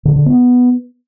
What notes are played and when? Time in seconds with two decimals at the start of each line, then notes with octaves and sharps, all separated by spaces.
0.05 D3
0.16 D3
0.26 B3